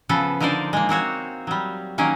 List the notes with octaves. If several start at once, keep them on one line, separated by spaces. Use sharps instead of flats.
C#3 F3 B3 A4
D3 F3 D#4 A#4 C5 D5
G#3 A#3
A#3 C4 F#4 C#5
F#3 G3
D#3 F#3 A#3 C#4